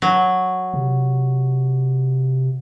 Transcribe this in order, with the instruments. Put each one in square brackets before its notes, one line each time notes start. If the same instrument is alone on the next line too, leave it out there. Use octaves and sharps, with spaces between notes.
[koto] F#3
[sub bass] C3